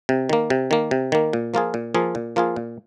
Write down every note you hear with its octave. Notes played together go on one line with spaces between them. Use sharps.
C3
D#3 A#3
C3
D#3 A#3
C3
D#3 A#3
A#2
F3 A#3 F4 G#4
A#2
F3 A#3 F4 G#4
A#2
F3 A#3 F4 G#4
A#2